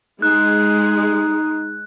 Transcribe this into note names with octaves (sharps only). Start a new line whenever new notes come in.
G#3 D#4 F#6